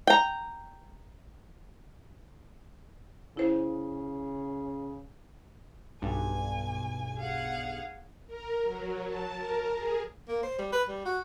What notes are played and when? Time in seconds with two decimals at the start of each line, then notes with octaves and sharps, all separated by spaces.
0.07 G5 A#5
3.37 C#3 E4 C5
6.02 B1 G2 G#5
7.17 G#4 F5 F#5
8.27 A#4
8.63 F#3
9.06 A5
9.36 A#4
9.75 G#4
10.28 A#3
10.43 C5
10.59 G3
10.72 B4
10.88 G3
11.05 F#4